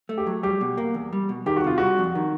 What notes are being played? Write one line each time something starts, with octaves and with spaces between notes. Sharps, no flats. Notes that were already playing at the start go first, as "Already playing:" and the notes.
A3
G4
F#3
G3 G4
B2
A#3
E2
G3
B2
D#3 G4
F#4
C3 F4
G3 F#4
F2
D#3